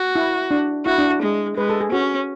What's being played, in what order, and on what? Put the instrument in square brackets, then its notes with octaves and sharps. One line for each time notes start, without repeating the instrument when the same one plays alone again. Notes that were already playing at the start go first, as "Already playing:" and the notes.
Already playing: [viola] F#4
[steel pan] E4
D4
[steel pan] E4 [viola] F#4
[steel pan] D4
[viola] G#3
[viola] G#3 [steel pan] B4
[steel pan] A4
G#4
[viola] C#4 [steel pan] F#4